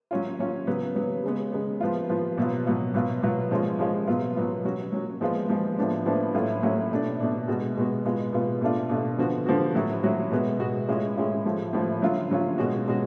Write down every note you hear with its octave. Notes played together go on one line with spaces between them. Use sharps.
F#3 C#4 F4
F#3 C#4 F4
C#3 F#3 B3
C#3 F#3 B3
C#3 G#3 B3
C#3 G#3 B3
F3 B3 F4
F3 B3 F4
B2 F#3 B3 F4
B2 F#3 B3 F4
B2 F#3 B3 F4
B2 F#3 B3 F4
F3 G#3 C#4 F4
F3 G#3 C#4 F4
B2 F#3 B3 F4
B2 F#3 B3 F4
F#3 C#4 F#4
F#3 C#4 F#4
F3 G#3 B3 F4
F3 G#3 B3 F4
A2 F3 B3 D4
A2 F3 B3 D4
A2 F#3 A3 C#4 F4
A2 F#3 A3 C#4 F4
B2 A3 D4
B2 A3 D4
B2 G#3 B3 F#4
B2 G#3 B3 F#4
B2 G#3 B3 F4
B2 G#3 B3 F4
B2 A3 D4 F4
B2 A3 D4 F4
D3 F3 B3 F#4
D3 F3 B3 F#4
A2 F#3 C#4 F#4
A2 F#3 C#4 F#4
B2 G#3 B3 F#4
B2 G#3 B3 F#4
A2 G#3 C#4 F4
A2 G#3 C#4 F4
A2 F3 A3
A2 F3 A3
D3 F#3 C#4 F4
D3 F#3 C#4 F4
B2 G#3 C#4 F#4
B2 G#3 C#4 F#4